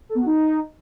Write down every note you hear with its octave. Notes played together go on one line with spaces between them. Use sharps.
A4
B3
F#4
D#4